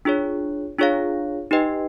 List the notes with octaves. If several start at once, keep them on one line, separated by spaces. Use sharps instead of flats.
D4 F4 G#4 C#5
D4 F4 G#4 C#5 F5
D#4 G4 B4 D#5 G5